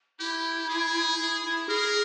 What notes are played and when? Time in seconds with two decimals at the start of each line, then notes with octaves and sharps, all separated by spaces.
0.19 E4 G4
0.69 G#4
1.19 E4
1.44 E4
1.69 G#4 A#4